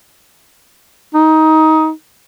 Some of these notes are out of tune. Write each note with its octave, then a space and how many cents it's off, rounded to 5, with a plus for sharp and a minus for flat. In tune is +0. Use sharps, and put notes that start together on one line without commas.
D#4 +15